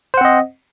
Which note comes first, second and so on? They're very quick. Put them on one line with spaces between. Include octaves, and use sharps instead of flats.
C5 F#5 C4 D#5